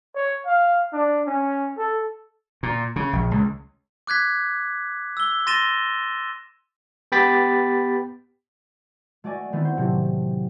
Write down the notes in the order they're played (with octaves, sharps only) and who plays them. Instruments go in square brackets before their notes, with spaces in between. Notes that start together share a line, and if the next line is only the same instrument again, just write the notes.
[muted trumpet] C#5
F5
D4
C#4
A4
[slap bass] A#2
C#3
A#1
C#2
[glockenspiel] D6 F#6 G#6 B6
E6 G7
C6 A6 A#6 D#7 E7 G7
[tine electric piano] B3 G4 G5 B5 A6 B6
[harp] A3 F#4 D5 D#5 G#5
D#3 A3 B3 C4 E4
C5
A2 C3 F#3